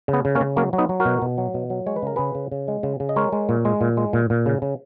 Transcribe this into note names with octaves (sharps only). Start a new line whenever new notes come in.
C#3
B3
C#3
A#3 C#4
C#3
F#3 A#3 C#4
F#3
B3 D#4
F#3
F#4 A#4
B2
B2
F#3
B2
F#3
G#3 C#5
B4
C#3 A#4
C#3 G#4 B4
C#3
C#3
G#3
C#3
C#3
D#5
G#3 A#4 C#5
G#3
A#2
G#3
A#2
G#3
A#2
A#2
C#3
C#3